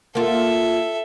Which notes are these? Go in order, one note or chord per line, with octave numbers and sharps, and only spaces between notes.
A#3 F4 A4 E5